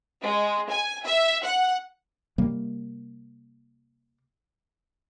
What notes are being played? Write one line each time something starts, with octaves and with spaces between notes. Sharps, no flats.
G#3
G#5
E5
F#5
C3 G3 A#3